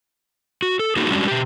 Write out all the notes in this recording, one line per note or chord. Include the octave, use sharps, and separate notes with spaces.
F#4
A4
A#3 D#4 F#4 G#4
G3 G#3 C#4 D4 F#4 G4
B2 G4